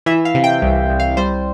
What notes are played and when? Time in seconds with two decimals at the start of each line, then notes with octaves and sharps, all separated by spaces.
0.06 E3 E5
0.25 F5
0.34 C3
0.44 G5
0.62 C2
0.90 C2
1.00 F5
1.17 G3 C5